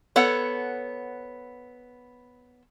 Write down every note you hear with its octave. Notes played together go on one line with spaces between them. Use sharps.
B3 A4 C#5 F#5